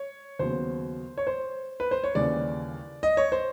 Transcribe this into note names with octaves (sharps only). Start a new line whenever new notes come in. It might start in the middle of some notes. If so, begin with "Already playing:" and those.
Already playing: C#5
D#2 C#3 F#3 B3 C5
C#5
C5
B4
C5
C#5
D#2 C#3 E3 G3 D5
D#5
C#5
C5